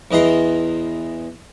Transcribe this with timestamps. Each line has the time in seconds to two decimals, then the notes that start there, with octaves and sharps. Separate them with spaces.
0.11 E2 E3 D#5 A#5 C6